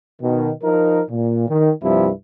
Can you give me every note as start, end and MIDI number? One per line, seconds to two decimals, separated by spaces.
0.22 0.51 47
0.22 0.51 51
0.64 1.02 53
0.64 1.02 63
0.64 1.02 70
1.10 1.47 46
1.49 1.72 51
1.83 2.10 36
1.83 2.10 43
1.83 2.10 48
1.83 2.10 53
1.83 2.10 64